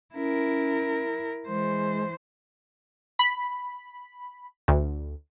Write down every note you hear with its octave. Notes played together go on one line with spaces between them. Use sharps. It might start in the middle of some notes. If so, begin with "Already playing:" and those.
C#4 E4 A#4
E3 G#3 C5
B5
D2